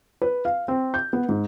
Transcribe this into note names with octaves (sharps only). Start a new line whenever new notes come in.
B4
F5
C4
G6
B3
G#2